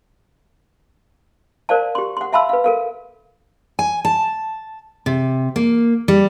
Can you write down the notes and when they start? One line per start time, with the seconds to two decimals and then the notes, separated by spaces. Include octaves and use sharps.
1.69 A#4 C5 D5 F5 A5
1.95 G4 C6
2.17 F#5 C6
2.33 E5 F5 A5 B5 C6 E6
2.49 B4 F5
2.64 A4 A#4 F5
3.79 G#5
4.05 A5
5.06 C3
5.56 A#3
6.08 G3